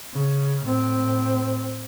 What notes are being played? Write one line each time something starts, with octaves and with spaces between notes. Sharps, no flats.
C#3
A2 C4